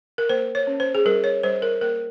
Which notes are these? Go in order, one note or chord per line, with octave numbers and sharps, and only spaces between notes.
A#4
A#3 C5
C#5
C#4
C5
G#4
G3 A#4
C#5
G3 C5
A#4
A#3 A#4